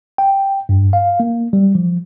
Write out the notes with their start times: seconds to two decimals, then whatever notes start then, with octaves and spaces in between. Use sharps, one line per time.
0.18 G5
0.69 G2
0.93 F5
1.20 A#3
1.53 G3
1.75 F3